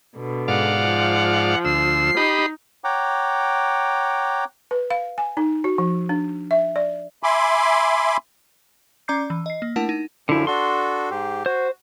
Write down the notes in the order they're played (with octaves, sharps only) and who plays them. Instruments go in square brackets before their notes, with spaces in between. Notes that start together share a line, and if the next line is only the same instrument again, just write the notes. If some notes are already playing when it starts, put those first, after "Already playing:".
[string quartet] B2 D3
[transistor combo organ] G#2 D5 F5 [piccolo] F#5
[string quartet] F3
[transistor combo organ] D2 E6 [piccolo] C7
[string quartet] D#4 [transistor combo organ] G4 D#5 B5
[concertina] C#5 F#5 G5 A#5 D6
[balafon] B4
F5
G#5
D#4
F#4
F3
D4
E5
D5
[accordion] E5 G#5 B5 C6 D6
[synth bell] C#4 D5 A#5 D6 G6 C7
E3
D#5 C7
A#3
A3 D4 E4 A#4 F#5 A5
D#4
[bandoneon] F#2 F3 [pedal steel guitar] D3 E4
[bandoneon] D4 F#4 A4 [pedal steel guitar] C6
[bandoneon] G#2 G4
[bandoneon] F#4 [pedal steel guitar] C5